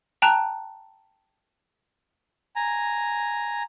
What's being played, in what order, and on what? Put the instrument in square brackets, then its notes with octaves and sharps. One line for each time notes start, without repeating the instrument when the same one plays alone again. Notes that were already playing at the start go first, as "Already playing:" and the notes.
[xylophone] G5 A5 A#5 F#6
[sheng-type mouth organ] G#5 A#5